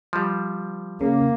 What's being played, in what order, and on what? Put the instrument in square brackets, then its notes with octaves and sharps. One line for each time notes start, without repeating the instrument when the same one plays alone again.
[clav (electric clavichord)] F3 G3
[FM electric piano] C#3 [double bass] A#3